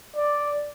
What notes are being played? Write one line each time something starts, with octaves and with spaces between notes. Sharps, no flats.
D5